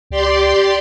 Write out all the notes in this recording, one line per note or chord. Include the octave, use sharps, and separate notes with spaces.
C#2 G4 D5 C6